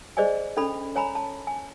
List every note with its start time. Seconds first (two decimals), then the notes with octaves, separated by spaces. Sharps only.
0.17 G#4 C5 D5 D#5 G#5
0.57 C#4 D4 A4 B5
0.96 C#5 G#5 A#5 B5
1.15 A5
1.47 G#5